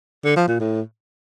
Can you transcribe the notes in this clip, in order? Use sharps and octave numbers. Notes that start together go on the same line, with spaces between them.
D3
F3
A#2
A2